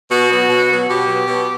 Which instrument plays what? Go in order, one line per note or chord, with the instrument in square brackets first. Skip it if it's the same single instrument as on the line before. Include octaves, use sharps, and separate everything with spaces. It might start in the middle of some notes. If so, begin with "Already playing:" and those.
[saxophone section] B2 F#4
F#3 B3
B2
F#3 B3
B2 G4
F#3 B3
B2